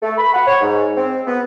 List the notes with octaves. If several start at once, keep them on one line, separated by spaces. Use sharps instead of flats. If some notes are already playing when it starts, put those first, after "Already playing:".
A3
B5
F#5
C#5
G#2
C4
B3